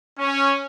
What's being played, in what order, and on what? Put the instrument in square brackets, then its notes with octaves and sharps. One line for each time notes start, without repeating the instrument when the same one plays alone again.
[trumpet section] C#4